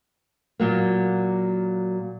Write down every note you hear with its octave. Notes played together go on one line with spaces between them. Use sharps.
A#2 F#3 A#3